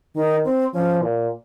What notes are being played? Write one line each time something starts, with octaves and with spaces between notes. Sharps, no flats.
D#3 D#4
C4
F3 C#4
A#2